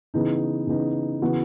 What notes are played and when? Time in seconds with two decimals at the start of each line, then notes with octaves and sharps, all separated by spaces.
0.14 C#3 E3 B3 D#4
0.67 C#3 E3 B3 D#4
1.22 C#3 E3 B3 F#4